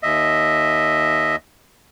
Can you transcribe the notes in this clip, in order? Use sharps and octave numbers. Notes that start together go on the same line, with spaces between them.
D#2 D#5 E5